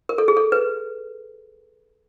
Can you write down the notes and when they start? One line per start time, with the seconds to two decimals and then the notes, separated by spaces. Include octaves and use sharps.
0.09 A#4
0.18 A4
0.28 G#4
0.37 A4
0.52 B4